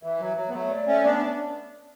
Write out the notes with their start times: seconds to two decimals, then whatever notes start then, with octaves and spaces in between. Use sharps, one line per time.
0.03 E3 E5
0.20 F#3
0.37 F#3
0.49 B3
0.53 F#3 A3
0.70 D5
0.87 A3 C#4
1.04 B3 D4